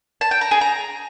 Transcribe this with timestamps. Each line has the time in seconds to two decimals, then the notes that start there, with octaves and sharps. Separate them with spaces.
0.21 A5
0.31 G5
0.41 A#5
0.51 G#4
0.61 A#5